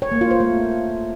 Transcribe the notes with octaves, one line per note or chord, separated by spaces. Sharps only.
C#5
A#3
F4
C5
A3